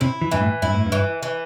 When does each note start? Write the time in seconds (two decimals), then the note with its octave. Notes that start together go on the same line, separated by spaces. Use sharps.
0.01 C3 E4
0.21 E3
0.31 G2 E3
0.41 A2
0.62 G2 E4
0.74 A2
0.86 G2
0.92 E3
1.23 E3